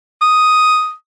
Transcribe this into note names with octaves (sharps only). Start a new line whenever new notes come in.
D#6